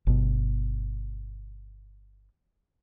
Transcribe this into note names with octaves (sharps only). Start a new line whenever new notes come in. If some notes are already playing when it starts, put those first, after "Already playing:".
G1 B2